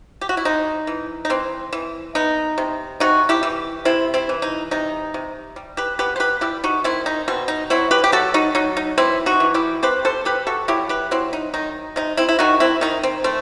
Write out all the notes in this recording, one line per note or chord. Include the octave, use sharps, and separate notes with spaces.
G4
F#4
E4
C4 D#4
E3
D#4
E3 C4
E3
B3 D#4
C3
C3 D#4 F#4
E4 G4
E3
C3 C4 E4
C4 E4
E3
D#4
C3 D#4
C3
G3
G4 B4
B3 G4 B4
C5
G4 B4
G3 E4 G4
D#4 F#4
D#3 C4 E4
D#4
B2 C4
D#4
F#3 C4 E4
G4 B4
G4
F#3 F#4 A4
D#4 F#4
F#3 D#4
D#4
E3 C4 E4
D#4 F#4
E3
E4 G4
C4 G4 B4
A4 C5
C4 G4 B4
F#4 A4
F#3 E4 G4
G4 B4
F#3 C4 E4
D#4
D#3 D#4
C3 D#4
C4 E4
E4
D#3 D#4 F#4
C4 E4
D#3 D#4
C4
A3 C4